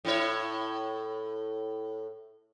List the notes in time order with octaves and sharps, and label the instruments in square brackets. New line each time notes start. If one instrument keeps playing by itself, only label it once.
[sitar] A2 E4 C#5